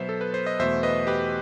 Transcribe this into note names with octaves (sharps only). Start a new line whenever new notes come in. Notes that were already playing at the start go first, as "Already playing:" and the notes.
Already playing: B2 F#3 B3 C5 E5
A4
B4
C5
D#5
E2 B2 A3 C5 E5
B4 D#5
G4 B4